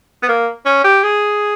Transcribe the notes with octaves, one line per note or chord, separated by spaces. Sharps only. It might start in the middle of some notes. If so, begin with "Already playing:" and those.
B3
A#3
C#4
G4
G#4